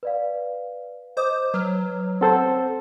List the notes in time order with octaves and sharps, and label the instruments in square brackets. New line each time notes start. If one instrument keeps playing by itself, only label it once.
[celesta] B4 D5 F5
[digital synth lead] C5 [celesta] D#5 D6 D#6
[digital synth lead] F#3 [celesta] B4 F6
[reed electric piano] C4 A4 C5 [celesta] F#5 A5